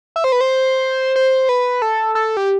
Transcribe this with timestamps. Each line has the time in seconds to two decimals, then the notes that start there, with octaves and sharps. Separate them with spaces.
0.16 E5
0.24 C5
0.32 B4
0.41 C5
1.16 C5
1.49 B4
1.82 A4
2.15 A4
2.37 G4